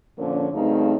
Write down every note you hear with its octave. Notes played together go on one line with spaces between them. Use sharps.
A#2 D3 F3 A#3 C#4
G2 C#3 F#3 A3 C4 D#4